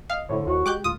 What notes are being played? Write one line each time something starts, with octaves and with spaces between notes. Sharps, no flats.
D#5 F5
A2 D3 E4 C5 C#5
D#2 F#4
G#3 G4 D6 F#6 G6
D2 A2 F4 D#6